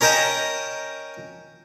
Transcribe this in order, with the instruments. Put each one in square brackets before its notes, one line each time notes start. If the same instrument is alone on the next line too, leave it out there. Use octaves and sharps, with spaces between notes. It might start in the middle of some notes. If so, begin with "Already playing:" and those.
[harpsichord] C#4 A#4 D#5 G5 A5 A#5